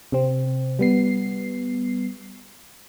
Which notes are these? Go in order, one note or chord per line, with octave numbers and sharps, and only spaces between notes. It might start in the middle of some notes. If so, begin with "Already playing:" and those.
C3 C4
G3 B3 C7